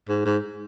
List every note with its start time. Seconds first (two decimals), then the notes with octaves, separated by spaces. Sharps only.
0.09 G#2
0.25 G#2